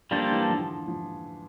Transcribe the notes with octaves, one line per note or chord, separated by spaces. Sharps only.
D3 F3 G3 A#3 D4 A4 C5
E3
D3 F3
F3